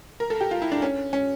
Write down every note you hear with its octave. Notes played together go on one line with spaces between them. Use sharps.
A#4
A4
G4
F4
E4
D4
C#4
C#4